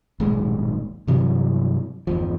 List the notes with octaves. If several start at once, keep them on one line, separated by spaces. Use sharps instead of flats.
D#1 B1 G#2 G#3
G2 C3 E3 F#3
G1 E2 F3